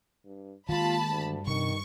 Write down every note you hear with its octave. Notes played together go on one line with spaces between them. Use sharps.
G2
D#3 G#3 A#3 F4 G4 A5 B5
D2 G2
C3 D#3 C#6